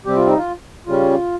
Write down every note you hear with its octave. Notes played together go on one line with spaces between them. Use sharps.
C3 G3 C4 G4
F4
D#4
F4
C#3 G3 C#4 F4